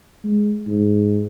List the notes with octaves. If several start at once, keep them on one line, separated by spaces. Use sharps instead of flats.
G#3
G#2